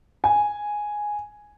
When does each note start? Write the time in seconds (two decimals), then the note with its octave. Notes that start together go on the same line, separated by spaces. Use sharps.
0.24 G#5